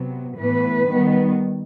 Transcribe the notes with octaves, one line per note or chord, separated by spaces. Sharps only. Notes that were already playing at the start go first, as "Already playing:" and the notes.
Already playing: C3 F#3 B3
A2 E3 B3 B4
D#3 G3 B3